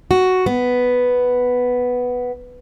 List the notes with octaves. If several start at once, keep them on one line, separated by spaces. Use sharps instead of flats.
F#4
B3